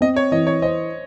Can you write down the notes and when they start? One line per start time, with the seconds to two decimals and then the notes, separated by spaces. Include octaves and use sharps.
0.01 C4 D#5
0.16 C#5
0.32 E3 D#5
0.47 C#5
0.62 C5 D#5